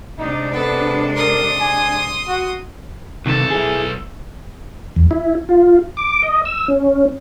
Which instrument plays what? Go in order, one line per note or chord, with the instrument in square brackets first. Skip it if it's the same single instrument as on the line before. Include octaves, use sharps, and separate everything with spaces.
[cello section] C3 G#3 D4 [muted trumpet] D#4
[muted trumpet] B3 [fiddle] A4
[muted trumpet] A#4 [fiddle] C6 D#6
[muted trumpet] G#5
F#4
[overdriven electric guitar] B1 A4 [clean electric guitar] C3 D#3
[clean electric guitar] E4 G#4
[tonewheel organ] E2
E4
F4
D6
D#5
E6
C#4